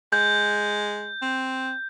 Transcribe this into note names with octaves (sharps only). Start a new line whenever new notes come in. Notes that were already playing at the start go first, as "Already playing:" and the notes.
G#3 G6
C4